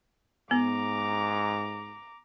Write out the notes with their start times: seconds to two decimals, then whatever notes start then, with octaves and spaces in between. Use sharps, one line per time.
0.51 G#2 B3 A#5 D6